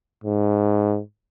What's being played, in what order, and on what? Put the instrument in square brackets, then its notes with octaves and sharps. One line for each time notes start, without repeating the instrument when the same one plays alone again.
[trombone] G#2